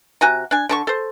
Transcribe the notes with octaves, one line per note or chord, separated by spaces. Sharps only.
C3 F#4 G#5 A#5
D4 G#5
D3 A5 C#6
A4 C5